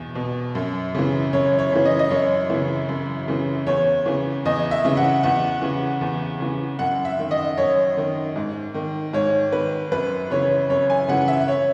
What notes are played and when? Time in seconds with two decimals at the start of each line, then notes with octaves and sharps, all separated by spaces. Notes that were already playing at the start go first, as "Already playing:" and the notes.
Already playing: E2 B2
0.15 B2
0.55 F#2
0.95 C#3 E3
1.33 F#2 C#5
1.59 C#5
1.72 C#3 E3
1.85 D#5
1.99 D#5
2.10 F#2 C#5
2.50 C#3 E3
2.89 F#2
3.28 C#3 E3
3.67 E2 C#5
4.06 C#3 E3
4.45 E2 D#5
4.71 E5
4.85 C#3 E3
4.97 F#5
5.23 E2 F#5
5.62 C#3 E3
6.01 E2
6.40 C#3 E3
6.79 F#2 F#5
7.05 E5
7.19 D#3
7.31 D#5
7.57 F#2 C#5
7.97 D#3
8.36 G#2
8.74 D#3
9.13 G#2 C#5
9.52 D#3 B4
9.91 F#2 B4
10.31 C#3 E3 C#5
10.70 F#2 C#5
10.90 G#5
11.08 C#3 E3 F#5
11.28 E5
11.48 C#5